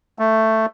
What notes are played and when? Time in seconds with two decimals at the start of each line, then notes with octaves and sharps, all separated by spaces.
0.19 A3